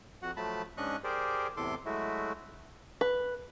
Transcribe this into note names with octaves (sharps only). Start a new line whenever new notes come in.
F2 F#4 F#5
F3 F#3 A3 A5 B5
G#2 C#4 D4 D#5 C#6 F#6
G4 G#4 A#4 C5 D5
E2 A2 C3 A4 C6 D6
F#3 G#3 A3 E4 F#4
B4